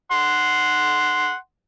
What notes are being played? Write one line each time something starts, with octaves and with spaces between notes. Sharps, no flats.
F#5 C6